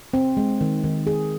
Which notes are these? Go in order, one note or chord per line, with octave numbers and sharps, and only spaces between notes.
C4
G#3
D#3
D#3
G#4